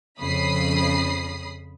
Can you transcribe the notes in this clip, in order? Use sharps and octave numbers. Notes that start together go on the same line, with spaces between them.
F2 C#3 B5 D#6 C7